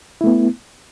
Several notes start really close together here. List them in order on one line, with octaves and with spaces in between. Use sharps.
E4 A3 B3